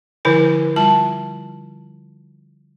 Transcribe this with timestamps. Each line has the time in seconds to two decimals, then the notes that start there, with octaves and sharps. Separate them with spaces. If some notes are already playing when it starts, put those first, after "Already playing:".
0.25 D3 F3 E4 C5 G#5
0.76 G3 F4 A5